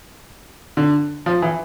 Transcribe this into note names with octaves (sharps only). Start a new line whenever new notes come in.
D3
F3
E3